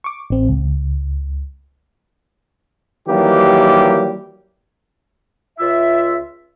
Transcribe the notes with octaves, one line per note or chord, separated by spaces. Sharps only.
C#6 D6
A1 C4
C#2
D#3 E3 F#3 G3 A#3 G4
C#2 F4 E5